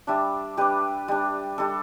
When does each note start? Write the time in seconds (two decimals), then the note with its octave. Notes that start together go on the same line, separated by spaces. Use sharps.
0.07 G3 D4 E5 A5
0.57 G3 D4 G4 B4
1.08 G3 D4
1.58 G3 D4 A4